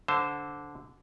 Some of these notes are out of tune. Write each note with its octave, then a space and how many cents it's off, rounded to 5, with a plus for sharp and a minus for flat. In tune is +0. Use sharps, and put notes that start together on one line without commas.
D3 -10 C5 +0 A5 +10